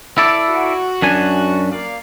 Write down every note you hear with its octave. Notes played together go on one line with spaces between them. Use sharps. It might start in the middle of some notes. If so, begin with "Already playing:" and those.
E4 A4 D5
F#4
F#2 D4 G#5
A#3 D5 F5